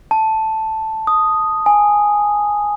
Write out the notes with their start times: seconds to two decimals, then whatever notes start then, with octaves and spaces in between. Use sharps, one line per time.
0.11 A5
1.07 D#6
1.66 G#5